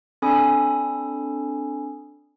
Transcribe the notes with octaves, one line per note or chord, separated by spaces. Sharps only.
C4 D4 A4 G#5 B5 D#6